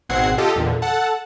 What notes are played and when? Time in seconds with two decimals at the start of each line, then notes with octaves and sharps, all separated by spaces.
0.09 G#1 B2 C4 F#5 G#6 C7
0.38 F4 G4 A4 D#5
0.56 E2 A#2 D3
0.82 A4 F#5 A5